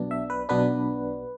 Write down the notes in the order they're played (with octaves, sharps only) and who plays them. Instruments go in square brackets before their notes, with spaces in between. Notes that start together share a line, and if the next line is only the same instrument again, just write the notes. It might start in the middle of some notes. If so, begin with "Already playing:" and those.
Already playing: [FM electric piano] B1 B2 B3 D4
E5
B4
B1 B2 B3 D4 B4